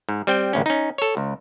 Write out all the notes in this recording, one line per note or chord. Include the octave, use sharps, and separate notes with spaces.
G#2
G3 C4 G5
A1 D2 C#4
C#4 D#4
A4 C#5
C#2